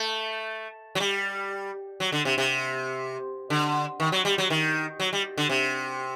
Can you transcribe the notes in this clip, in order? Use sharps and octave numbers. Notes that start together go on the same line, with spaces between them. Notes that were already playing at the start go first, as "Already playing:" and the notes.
Already playing: A3
F#3
G3
F#3
D3
C3
C3
D3
D#3
F#3
G3
F#3
D#3
F#3
G3
D3
C3